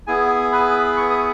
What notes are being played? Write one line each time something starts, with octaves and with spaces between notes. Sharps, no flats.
B3 E4 G#4 G#5
B4 B5
C#6
D#6